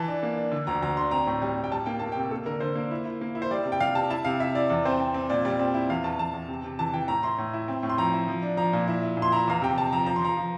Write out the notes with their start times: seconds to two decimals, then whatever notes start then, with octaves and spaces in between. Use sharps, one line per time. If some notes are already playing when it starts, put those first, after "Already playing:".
Already playing: E3 A5
0.08 D4
0.23 A#3
0.37 D4
0.52 D3
0.67 D2 A#5
0.82 D2 A#5
0.97 D4 C6
1.11 C4 A#5
1.27 A2
1.42 G3
1.56 A2
1.64 G5
1.72 G3 A5
1.86 A#3 G5
1.99 A#3 A5
2.12 C3 G5
2.31 A#3 A4
2.46 D3 A#4
2.60 D3 C5
2.75 A#3
2.91 E4
3.05 E4
3.21 A#3
3.35 E4
3.42 C5
3.51 G3 D5
3.65 C3
3.72 G5
3.80 G3 F5
3.95 C3 A5
4.10 E4 A5
4.25 C3 F5
4.40 E4 E5
4.55 E4 D5
4.69 E2 D5
4.85 C4 C5
5.00 C4
5.14 C4
5.30 A#2 D5
5.45 G3 D5
5.59 C4
5.74 E4
5.89 E2 F5
6.04 E2 A5
6.19 E2 A5
6.33 E2
6.48 C3
6.64 C3
6.79 E3 A5
6.93 E3 G5
7.08 A2 A#5
7.23 E4 C6
7.38 A2
7.53 E4
7.68 C4
7.83 A2
7.89 C6
7.98 F3 A#5
8.13 E4
8.28 F3
8.43 D4
8.57 F3 A#5
8.73 A#2
8.88 E4
9.03 E4
9.17 A#2
9.22 C6
9.32 E4 A#5
9.48 E2 F5
9.62 C3 G5
9.78 C3 A5
9.92 F3 A#5
10.06 F3 A#5
10.16 C6
10.21 F3 A#5
10.37 F3